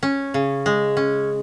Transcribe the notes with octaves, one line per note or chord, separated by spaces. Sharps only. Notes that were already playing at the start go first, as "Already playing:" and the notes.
C#4
C#3
G#3
C#4